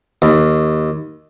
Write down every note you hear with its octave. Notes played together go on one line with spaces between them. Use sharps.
D#2